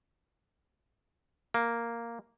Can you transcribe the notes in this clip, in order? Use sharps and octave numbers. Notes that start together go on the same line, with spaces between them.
A#3